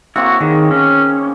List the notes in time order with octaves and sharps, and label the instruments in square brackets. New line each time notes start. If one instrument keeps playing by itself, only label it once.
[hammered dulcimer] A#3 C4 C#5 [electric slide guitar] E4 F#4
[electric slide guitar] D#3 [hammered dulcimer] G#4
[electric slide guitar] C#4